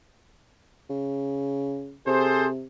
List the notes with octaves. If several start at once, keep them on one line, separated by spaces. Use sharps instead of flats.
C#3
C3 G#4 A4 C5